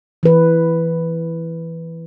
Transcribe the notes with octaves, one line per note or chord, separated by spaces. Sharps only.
E3 B4